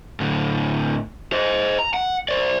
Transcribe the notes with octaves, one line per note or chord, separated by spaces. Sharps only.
A2 D3
C5 D#5
A#5
F#5
C5 D5